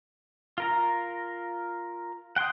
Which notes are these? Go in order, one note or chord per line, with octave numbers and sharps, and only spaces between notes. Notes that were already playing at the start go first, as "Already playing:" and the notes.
F4 A#4 A#5
F#5 G5 C6 D#6